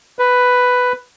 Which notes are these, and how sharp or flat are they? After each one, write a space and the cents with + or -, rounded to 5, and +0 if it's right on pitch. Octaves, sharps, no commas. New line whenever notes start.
B4 +5